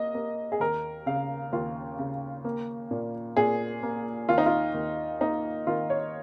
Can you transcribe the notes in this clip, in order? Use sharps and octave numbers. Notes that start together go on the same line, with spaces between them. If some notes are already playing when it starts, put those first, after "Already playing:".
Already playing: A#3 D#5
A#3
G#4
D#2 A#4
C#3 F5
D#2 F4
C#3
A#3
A#2
A#2 G#4
A#3
D#2 F4
D#4
F4
D#2
A#3 D#4
D#3 F4
C#5